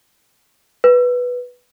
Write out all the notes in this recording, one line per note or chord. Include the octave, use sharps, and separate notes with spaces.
B4